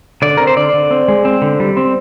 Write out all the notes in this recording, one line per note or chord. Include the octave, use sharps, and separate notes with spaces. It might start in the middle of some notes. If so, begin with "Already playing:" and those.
D3 D5
C4 A#4
C5
D3 D5
D3
C4
G#3
C4
D3
G3
C4